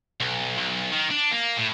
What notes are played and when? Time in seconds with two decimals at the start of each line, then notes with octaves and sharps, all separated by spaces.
0.20 B1
0.57 B1
0.92 D#3
1.10 D4
1.31 A#3
1.57 A2